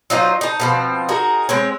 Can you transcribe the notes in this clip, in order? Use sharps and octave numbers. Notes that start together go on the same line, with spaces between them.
F#3 D#4 F4 C5
D#4 A5
B2 F3 C4
D#4 F#4 G#4 A#4
G#3 C4 C#5